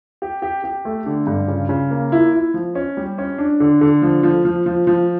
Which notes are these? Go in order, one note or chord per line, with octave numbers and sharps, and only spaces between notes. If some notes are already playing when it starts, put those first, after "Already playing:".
G4
G4
G4
A3
D3
G2
C#3
C#3
A#3
E4
E4
F3
C#4
G3
C#4
D4
D3
D3
F3
F3
F3
F3
F3